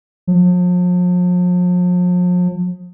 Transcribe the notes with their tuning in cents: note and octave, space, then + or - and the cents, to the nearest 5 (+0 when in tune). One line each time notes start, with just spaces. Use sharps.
F3 +40